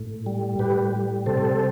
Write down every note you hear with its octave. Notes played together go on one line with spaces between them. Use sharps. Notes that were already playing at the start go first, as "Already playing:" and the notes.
Already playing: A2
G3
A2 G4 B4
G3
C3 A4 C5